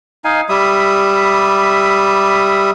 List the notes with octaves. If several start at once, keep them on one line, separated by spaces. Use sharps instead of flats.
D#4 F5 G#5
G3 E5 B5 D#6